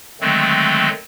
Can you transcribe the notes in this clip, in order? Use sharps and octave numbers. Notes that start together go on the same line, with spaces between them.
D3 D#3 F#3 G#3 A3 C4